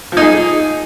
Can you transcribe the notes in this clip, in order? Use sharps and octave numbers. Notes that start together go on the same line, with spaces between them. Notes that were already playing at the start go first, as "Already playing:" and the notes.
F3 D#4 G#4